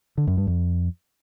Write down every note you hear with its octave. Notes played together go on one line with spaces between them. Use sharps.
D3
F#2
G2
F2